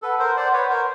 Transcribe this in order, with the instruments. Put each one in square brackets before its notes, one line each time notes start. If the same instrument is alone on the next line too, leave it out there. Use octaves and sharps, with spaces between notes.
[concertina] A4 B4 [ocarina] F#5
[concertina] A#4 C5
C5 D5
B4 C#5
A#4 C5